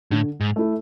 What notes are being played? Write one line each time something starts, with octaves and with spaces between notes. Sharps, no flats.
A2 D3
G#2
A3 E4